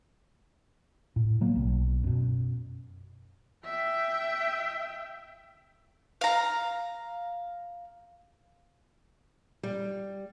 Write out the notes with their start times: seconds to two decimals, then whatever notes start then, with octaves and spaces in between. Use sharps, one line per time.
1.16 A2
1.41 C3 F#3 A#3 B3
1.56 B1
2.04 F#2 B2
3.64 E5 G5
6.21 F5 A#5
9.63 G3